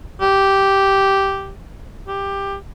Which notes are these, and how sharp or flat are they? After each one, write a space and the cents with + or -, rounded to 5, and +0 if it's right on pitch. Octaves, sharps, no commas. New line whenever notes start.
G4 -5
G4 +15